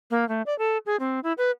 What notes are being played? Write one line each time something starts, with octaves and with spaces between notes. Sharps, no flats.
A#3
A3
D5
A4
G#4
C4
E4
B4